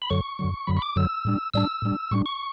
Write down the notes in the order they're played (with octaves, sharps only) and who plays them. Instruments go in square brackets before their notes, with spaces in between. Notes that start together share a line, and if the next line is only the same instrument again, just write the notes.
[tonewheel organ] B5
F#2 D3 F#3 C#6
F#2 D3 F#3
F#2 D3 F#3 B5
C#6
D6
F#2 D3 F#3 E6
A2 G3 D4
A2 G3 D4 E6
A2 G3 D4
A2 G3 D4 C#6
C#6